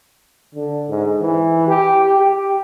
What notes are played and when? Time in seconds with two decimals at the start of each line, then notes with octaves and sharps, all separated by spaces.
0.55 D3
0.89 G#2
1.21 E3
1.68 G4
2.18 G4